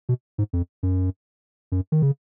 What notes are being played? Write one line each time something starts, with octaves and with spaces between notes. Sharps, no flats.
B2
G#2
F2
F#2
F#2
D#3
C#3